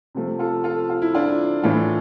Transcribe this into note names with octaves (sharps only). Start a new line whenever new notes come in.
C3 F3 A3
F4 A4
F4 A4
F4
E4
D4 F4
A2 E3 A3 D4 F4